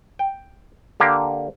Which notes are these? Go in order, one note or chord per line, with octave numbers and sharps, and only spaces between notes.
G5
D3 A#3 G4